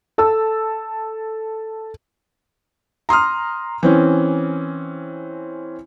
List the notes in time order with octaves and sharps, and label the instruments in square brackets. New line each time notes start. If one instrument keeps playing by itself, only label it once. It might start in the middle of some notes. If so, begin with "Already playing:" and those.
[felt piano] A4 A5 E6
A#5 C6 D#6 F6
E3 C4 C#4